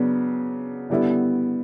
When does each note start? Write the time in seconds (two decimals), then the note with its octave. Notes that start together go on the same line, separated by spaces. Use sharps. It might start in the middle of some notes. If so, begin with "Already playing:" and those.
Already playing: C#3 F#3 B3 D4
0.90 D3 G3 B3 E4